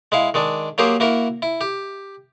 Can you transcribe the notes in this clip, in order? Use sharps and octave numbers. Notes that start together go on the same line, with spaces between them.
G#3 E4 F5
D#3 G#3 D4
F#3 A#3 G4 G#4 A#4 C5
A#3 E4 F#4 A#4
E4
G4